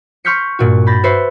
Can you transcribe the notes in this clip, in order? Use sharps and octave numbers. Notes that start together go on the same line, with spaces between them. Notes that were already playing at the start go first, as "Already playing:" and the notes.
C6 C#6 F6 G6 B6 C#7
G2 A#2 F#4
B5 G6 A6 A#6
F#4 B4 C5 E5